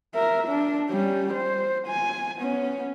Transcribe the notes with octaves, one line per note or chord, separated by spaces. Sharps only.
A#4 E5
D4
G3 C#4
C5
G#5
B3 C#4